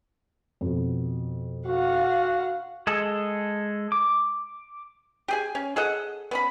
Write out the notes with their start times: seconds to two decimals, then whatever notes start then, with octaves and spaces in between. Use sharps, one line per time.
0.61 F2 B2
1.66 F#4 F5 F#5
2.87 G#3 G#4 A4
3.92 D6
5.28 G4 G#4 G#5
5.55 C#4
5.76 G#4 A4 D#5 F#5
6.31 B3 C#4 B5